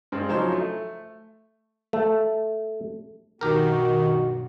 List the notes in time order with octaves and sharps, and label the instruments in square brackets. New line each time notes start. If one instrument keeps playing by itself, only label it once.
[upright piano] G2 G#3 C4
C#3 F3 F#3 C#4 D#4 C5
A3
[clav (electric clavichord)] A3
[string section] B1 G2 [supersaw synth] D#3 [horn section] F#4 [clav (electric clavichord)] G4 A#4